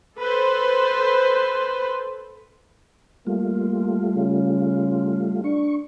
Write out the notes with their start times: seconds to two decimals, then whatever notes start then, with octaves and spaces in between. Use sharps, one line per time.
0.17 A4 B4 C5
3.27 G3 A3 A#3 F4
4.16 C#3
5.44 D4 C#6